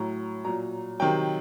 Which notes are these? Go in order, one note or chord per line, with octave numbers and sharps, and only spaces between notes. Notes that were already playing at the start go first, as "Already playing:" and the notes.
Already playing: A2 F#3 A#5
A#2 F#3 A#5
C3 D#3 F#3 G5